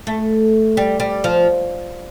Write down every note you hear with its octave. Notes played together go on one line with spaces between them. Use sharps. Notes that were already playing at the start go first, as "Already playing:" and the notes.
A3
G3
G3
F3